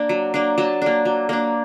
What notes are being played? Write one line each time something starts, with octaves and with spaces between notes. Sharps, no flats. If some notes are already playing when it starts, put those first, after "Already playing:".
Already playing: A#3 D4
F#3
A#3 D4
F#3 A5
A#3 D4
F#3
A#3 D4